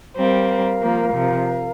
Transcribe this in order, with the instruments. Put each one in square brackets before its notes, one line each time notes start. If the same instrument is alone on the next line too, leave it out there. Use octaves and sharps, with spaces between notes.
[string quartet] G3 C4 [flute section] A#4 F5 A#5
[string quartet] F3 A#3
C3 F3